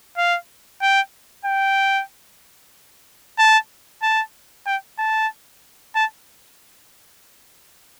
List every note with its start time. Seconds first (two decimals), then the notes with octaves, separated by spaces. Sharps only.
0.18 F5
0.82 G5
1.45 G5
3.39 A5
4.02 A5
4.67 G5
4.98 A5
5.95 A5